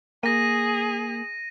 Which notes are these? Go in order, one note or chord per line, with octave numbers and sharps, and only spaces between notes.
A#3 G#4 A#6 D#7